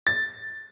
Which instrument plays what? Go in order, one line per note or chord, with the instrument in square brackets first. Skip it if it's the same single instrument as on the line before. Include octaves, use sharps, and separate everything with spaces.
[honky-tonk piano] A6